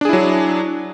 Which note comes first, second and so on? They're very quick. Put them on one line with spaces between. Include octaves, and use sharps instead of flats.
D4 G#4 E4 F#3